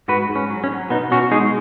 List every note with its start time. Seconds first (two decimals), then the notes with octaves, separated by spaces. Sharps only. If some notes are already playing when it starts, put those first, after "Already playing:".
0.08 G#2 F#4 B4
0.29 G#2
0.36 C#4
0.50 F#3
0.64 C#4
0.71 F#3
0.90 B2 B3 D#4
1.11 B2 C#4 F#4
1.31 G#3 D#4 G#4